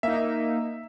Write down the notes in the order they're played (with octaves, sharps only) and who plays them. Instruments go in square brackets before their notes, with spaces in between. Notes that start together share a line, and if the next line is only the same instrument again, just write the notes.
[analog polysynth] A#3 D#4 [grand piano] E5